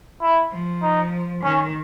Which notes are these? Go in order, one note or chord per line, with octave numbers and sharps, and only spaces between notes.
E4
F3
D#4
D#3 C#4